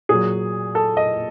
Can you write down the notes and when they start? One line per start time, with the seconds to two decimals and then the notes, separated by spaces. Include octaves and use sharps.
0.09 A#2 F#3 G#4
0.75 A4
0.97 D#5